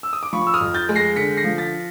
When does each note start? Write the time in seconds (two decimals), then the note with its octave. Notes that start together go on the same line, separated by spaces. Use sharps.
0.03 E6
0.13 D#6
0.23 D6
0.33 F3 B5 C#6
0.47 E6
0.54 D#6 F6
0.61 F2
0.74 G6 A6
0.89 G#3
0.96 A#6 C7
1.16 D3 B6 C#7
1.37 A#6 C7
1.44 F3
1.58 A6 B6